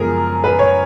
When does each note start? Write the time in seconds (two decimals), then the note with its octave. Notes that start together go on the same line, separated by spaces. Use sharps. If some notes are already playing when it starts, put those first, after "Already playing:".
Already playing: F#2 C#3 F3 G#3 B3 G#4 A#4
0.44 B4
0.59 C#5